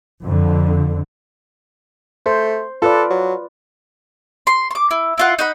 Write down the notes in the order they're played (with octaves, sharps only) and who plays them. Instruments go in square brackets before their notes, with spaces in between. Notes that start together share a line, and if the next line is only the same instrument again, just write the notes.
[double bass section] F2 D3
[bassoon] A3 [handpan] C5
[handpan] F4 B4 D5 [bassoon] A4
[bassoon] F#3
[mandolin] C6
C6 D6
E4
E4 F4 F#5
D#4 F#5 B5